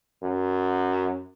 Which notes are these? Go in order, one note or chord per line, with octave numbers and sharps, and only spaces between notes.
F#2